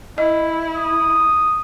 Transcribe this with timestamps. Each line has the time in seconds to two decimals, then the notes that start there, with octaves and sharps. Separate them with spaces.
0.18 E4 D#5
0.75 D#6